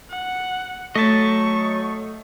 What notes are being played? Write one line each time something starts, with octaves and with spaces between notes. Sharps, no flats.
F#5
F#3 A3 D#5 A5 C#6 B6